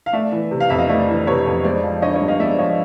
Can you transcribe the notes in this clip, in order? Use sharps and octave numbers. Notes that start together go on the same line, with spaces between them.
F5
A3 D5 E5
E3
C3
F5
F2 E5
D#5 F5
A3 D5 E5
E3
C3 B4 C#5
F2
G#3 C5 D5
F3
D3 C#5 D#5
C#5 D#5
G2
D#5 F5
G#3 D5 E5
F3 C#5 D#5